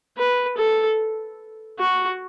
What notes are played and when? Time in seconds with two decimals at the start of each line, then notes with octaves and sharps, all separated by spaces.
0.18 B4
0.58 A4
1.79 F#4